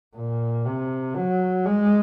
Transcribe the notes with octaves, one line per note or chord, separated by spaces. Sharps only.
A#2
C3
F#3
G#3